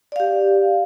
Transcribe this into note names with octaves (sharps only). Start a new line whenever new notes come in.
G4 D5 F5